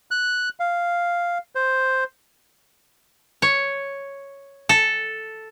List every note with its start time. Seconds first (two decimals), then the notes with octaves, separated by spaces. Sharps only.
0.11 F#6
0.60 F5
1.55 C5
3.42 C#5
4.69 A4